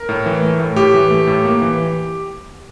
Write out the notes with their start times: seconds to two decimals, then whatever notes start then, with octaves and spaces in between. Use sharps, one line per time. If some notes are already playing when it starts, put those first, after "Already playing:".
Already playing: A#4
0.09 A2
0.26 E3
0.42 A3
0.60 A2
0.76 A2 G4
0.94 E3
1.11 A3
1.27 A2
1.45 A#3
1.62 E3